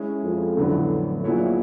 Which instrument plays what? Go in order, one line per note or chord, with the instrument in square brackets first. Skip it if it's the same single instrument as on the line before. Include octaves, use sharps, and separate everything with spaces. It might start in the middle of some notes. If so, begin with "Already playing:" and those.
Already playing: [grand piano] G#3 C#4 E4
[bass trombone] F2
[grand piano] F2 D3 F#3 B3 D4 [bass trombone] A2
[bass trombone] A#2 [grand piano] F#3 B3 E4 G#4 C#5